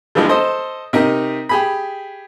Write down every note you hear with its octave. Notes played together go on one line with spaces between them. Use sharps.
D3 E3 F3 G3 G#3
A4 C5 D#5
C3 D#4 A#4
G4 G#4 B5